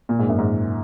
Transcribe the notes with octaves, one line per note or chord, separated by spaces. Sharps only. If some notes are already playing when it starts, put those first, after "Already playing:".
A#2
G#2
F#2
G#2